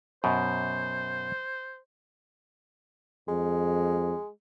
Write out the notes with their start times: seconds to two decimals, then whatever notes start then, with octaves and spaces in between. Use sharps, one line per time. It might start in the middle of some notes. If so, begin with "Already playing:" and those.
0.24 F#2 B2 C5
3.28 F2 G#3